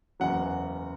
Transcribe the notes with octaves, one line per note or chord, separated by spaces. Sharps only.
F#1 E2 C#3 F#3 F#5